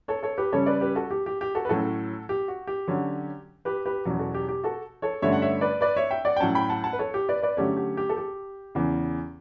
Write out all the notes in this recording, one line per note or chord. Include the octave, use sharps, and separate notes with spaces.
A4 C#5
A4 C#5
G4 B4
C#3 G3 C#4 A4 C#5
B4 D5
G4 B4
F#4 A4
G4
G4
G4
F#4 A4
B4
A2 F#3 C#4 F#4 A4
G4
F#4
G4
D3 F#3 C#4
G4 B4
G4 B4
E2 B2 F#3 C#4
F#4 A4
G4
G4
F#4 A4
A4 C#5
G2 D3 A3 C#4 C#5 E5
F#5
C#5 E5
B4 D5
B4 D5
C#5 E5
E5 G5
D5 F#5
G5
A2 F#3 C#4 F#5 A5
G5 B5
F#5 A5
F#5 A5
B4
A4 C#5
G4
B4 D5
B4 D5
D3 F#3 A3 C#4 G4
G4
G4
A4
G4
E2 C#3 E3